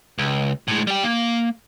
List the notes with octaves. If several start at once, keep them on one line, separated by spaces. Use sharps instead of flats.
C#2
A2 G#3
G3 G5
A#3